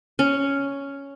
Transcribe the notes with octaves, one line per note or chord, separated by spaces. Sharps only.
C#4